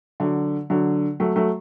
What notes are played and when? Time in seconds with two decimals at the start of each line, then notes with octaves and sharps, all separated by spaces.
0.20 D3 F#3
0.70 D3 F#3
1.20 F#3 A3
1.36 F#3 A3